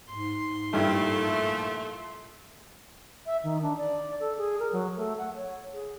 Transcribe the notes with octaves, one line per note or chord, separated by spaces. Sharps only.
G#2 C6
G2 A#2 F3 A3 E4
E5
D#3
D4
D5
A4
G#4
A#4
F#3
A3
F#5
C#5
G#4